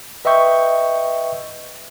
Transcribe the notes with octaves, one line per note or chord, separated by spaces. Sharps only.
B4 D#5 E5 G5 C#6 G6